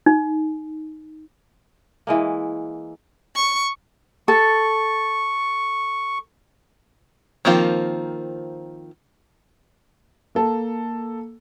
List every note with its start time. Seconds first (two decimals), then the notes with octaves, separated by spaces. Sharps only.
0.06 D#4
2.07 E3 G#3 A#3
3.35 C#6
4.28 A4 C#6
7.45 D#3 F3 A#3 C4 F4
10.35 A#3 A4